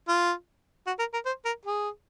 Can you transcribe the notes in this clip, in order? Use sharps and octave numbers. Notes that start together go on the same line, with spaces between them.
F4
F#4
A#4
A#4
C5
A#4
G#4